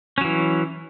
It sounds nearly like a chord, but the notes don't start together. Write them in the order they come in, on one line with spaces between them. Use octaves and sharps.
C#4 F#3 E3